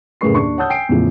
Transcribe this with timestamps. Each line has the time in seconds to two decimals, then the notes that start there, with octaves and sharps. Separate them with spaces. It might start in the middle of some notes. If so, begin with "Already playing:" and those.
0.21 F#1 A2 G#4 B4 C#6 C7
0.34 D#2 D4 C#6
0.57 C#5 F#5 A5 D#6 E6 G6
0.70 G5 G#5 C7 D7
0.89 E2 A2 C#3 E3 F3